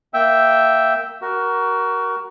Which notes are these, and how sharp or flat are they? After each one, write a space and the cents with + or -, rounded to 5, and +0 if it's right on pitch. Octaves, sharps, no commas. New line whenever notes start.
A#3 +0 E5 +0 G5 -10
F#4 +20 A#4 +10